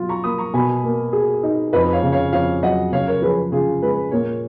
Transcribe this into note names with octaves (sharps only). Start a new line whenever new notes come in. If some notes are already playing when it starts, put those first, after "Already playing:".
Already playing: B2 F#3 F4
A#5 C#6
A#3 B5 D#6
A#5 C#6
B2 G#5 B5
A#3
G#4
D#4
F2 B4 D#5
C#5 F5
C#3
C#5 F5
F2 C#5 F5
F#3 D#5 F#5
C#3 C#5 F5
A#4 C#5
F3 G#4 B4
C#3 F4 G#4
G#3 G#4 B4
A#2 A#4 C#5